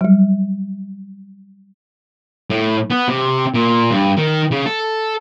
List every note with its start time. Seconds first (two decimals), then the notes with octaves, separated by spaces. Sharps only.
0.01 F#3 G3
2.50 A2
2.90 B3
3.08 C3
3.54 A#2
3.91 G2
4.17 D#3
4.51 C#3
4.66 A4